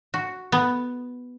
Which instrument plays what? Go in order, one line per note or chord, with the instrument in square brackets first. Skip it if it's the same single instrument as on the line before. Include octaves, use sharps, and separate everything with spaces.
[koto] F#4
B3